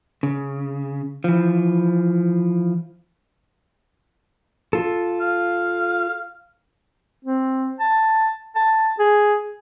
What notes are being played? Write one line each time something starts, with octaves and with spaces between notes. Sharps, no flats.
C#3
E3 F3
F4 A4
F5
C4
A5
A5
G#4